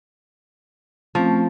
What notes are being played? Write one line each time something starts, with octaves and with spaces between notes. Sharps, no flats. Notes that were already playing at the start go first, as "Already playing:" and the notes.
F3 A3 C4 C#4